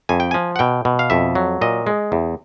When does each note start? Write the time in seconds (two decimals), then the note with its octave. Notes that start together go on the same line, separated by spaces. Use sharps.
0.09 F2 G#5
0.20 G5
0.31 F3 G#5
0.56 F#5
0.59 B2 G5
0.85 B2
0.99 F5
1.10 F2 E5
1.35 F#3
1.61 A#2 D#5
1.87 G#3
2.12 E2